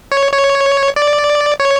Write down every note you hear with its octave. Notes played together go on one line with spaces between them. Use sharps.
C#5
C#5
D5
C#5